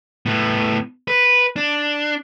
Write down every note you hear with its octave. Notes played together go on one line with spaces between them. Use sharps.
A2 B3
B4
D4